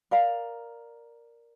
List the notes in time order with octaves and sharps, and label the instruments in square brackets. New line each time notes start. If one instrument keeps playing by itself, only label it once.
[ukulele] A#4 D5 F5 A#5